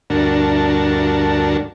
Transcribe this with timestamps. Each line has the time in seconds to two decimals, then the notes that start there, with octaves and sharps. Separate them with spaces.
0.10 D2 G2 D4 F#4 A#4 A5